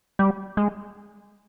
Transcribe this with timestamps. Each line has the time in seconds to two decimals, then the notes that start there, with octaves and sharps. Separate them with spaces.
0.19 G3
0.57 G#3